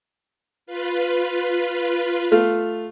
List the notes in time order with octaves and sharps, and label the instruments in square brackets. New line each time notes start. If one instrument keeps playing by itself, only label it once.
[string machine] F4 B4
[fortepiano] A3 F4